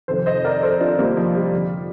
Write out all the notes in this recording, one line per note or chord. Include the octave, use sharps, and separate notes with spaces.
F2 C3 D#3 A4 C5
C5 D#5
A#4 D5
A4 C5
D4 F4
G3 A#3
F3
G3
F2 D3